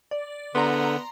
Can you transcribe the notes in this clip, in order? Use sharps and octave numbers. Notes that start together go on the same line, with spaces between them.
D5
D3 B3 A#5 C6